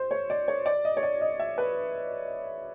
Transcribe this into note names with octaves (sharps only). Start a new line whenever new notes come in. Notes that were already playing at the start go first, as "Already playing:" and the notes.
Already playing: C5
C#5
D5
C#5
D5
D#5
C#5
D5
D#5
E5
B4